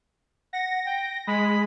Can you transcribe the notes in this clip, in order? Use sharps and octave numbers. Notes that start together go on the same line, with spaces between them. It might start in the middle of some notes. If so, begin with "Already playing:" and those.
F#5 A#6
G5
G#3 B5